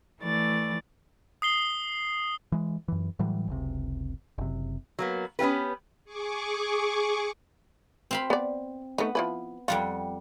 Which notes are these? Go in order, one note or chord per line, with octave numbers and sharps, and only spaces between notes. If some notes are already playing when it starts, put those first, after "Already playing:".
E3 A3 D5 A6
D#6 C7 G7
E3 G#3
F#2 E3
A2 E3 F#3 G3
F#1 C#2 C3
F#1 C3
F#3 A#3 B3
B3 C#4 F4 G4 B4
G#4 C#6 D6
C4 F5 B5
B3 D5
A3 B3 D#4
F3 E4 B4
F2 G3 F4 F#5